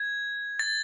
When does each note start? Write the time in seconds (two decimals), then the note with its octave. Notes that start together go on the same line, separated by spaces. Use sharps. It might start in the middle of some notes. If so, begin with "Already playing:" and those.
Already playing: G#6
0.59 A6